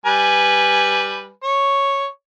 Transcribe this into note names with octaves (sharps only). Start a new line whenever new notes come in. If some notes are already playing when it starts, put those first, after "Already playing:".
G3 B4 G#5
C#5